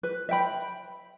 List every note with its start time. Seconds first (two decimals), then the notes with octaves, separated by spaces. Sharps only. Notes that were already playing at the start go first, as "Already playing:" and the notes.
0.03 B4
0.29 E5 G5 B5